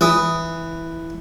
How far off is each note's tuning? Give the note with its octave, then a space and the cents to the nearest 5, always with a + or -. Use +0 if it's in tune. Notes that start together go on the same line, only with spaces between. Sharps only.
E3 +0 D#6 +0